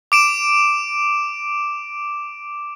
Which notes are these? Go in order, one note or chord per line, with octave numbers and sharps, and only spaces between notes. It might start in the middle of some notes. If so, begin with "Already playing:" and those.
D6 D7 E7